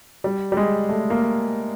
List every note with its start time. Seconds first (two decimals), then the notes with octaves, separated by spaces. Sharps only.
0.24 G3
0.52 G3
0.57 G#3
0.89 A3
1.10 A#3